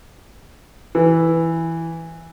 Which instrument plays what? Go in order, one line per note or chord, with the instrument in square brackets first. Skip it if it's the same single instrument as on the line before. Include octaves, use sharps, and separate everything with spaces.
[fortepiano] E3